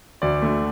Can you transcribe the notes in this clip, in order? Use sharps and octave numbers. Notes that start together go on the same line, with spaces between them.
D2 D5
D3 A3